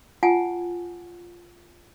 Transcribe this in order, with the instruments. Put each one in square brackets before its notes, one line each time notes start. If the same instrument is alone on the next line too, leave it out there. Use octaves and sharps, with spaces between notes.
[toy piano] F4 F#5 G#5 A5